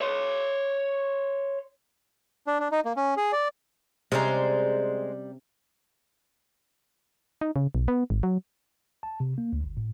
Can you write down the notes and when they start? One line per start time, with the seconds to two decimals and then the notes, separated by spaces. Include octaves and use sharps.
0.01 C#5 C6
2.47 D4
2.60 D4
2.72 D#4
2.85 A#3
2.97 C#4
3.17 G#4
3.33 D5
4.12 C3 G3 G#3 C#4 C5 D5 A#5
7.41 D#4
7.56 C#3
7.75 B1
7.88 B3
8.10 G#1
8.23 F#3
9.03 A5
9.20 C3
9.38 A#3
9.53 D2
9.64 G1
9.77 A2